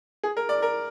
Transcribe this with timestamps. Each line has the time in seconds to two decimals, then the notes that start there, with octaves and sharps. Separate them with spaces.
0.23 G#4
0.37 A#4
0.49 D5
0.62 A#4